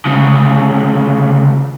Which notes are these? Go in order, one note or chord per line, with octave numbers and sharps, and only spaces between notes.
D2 C#3